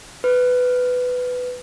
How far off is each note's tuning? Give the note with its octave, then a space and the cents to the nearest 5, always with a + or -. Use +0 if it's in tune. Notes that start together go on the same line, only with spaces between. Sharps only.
B4 +10